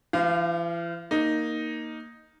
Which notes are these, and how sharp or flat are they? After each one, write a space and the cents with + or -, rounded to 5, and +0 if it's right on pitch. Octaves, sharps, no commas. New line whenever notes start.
E3 +45 F5 -10
A#3 +0 D#4 +0